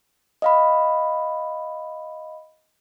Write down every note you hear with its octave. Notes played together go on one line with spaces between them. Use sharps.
D#5 F5 B5